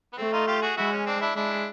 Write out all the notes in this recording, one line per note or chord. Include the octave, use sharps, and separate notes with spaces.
B3
A3 C4
D#4 F4
F4 G4
F#4 G#4
G#3 E4 F#4
C#4
C4 D4
D4 E4
G#3 D4 E4